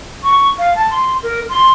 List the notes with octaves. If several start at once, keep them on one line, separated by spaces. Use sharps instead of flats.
C#6
F5
A5
C6
A#4
C6